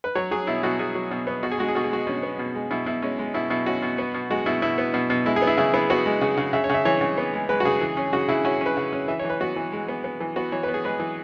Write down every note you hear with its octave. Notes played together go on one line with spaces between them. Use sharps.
B4
F#3 C#5
F#3 G#4
B2 E4
B2 F#4
B2 G#4
F#3
B2
B3
B2 F#4
G#4
G#3 F#4
G#4
B2 F#4
G#4
G#3 F#4
B2 C#4
B3
B2
G#3
B2 E4
B2 E4
G#3 C#4
G#3
B2 E4
B2 E4
C#4 F#4
B2
B3
B2
G#3 F#4
B2 E4
B2 E4
B3
B2
B2
G#3 E4
G#4
B3
E4
C#3 E4
B3 E4
B3 F#4
G#3
C#3
C#3
C#3 E5
C#5
C#3 E5
E3 C#5
C#3
B3
G#3
G#3 B4
F#4
C#3 G#4
E3
C#4
C#3 F#4
C#3 E4
C#4 F#4
C#4
B4
C#3
C#4
E3 E5
C#5
E3 B4
B3 F#4
E3
G#3
B3
B3
E3
B3 F#4
E3 C#5
B3 B4
G#4
G#3 B4
E3